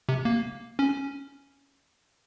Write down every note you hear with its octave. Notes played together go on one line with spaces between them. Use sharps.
C3
A#3
C#4